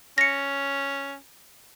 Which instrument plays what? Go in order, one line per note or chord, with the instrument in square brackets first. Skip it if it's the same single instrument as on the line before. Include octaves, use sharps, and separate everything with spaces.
[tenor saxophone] C#4 [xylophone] A#6 C#7